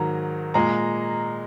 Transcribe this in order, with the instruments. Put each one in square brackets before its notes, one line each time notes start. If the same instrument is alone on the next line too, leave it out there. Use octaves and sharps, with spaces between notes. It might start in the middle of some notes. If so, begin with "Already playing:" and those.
Already playing: [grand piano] G#2 D#3 F#3 A#5
A#2 G#3 A#5